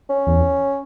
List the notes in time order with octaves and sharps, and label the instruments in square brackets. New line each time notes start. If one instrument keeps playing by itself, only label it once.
[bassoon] C#4
[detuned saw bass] E2